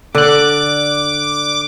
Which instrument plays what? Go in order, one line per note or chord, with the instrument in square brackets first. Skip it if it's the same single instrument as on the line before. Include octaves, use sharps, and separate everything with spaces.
[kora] D3 [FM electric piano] D5 F#6 [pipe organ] D6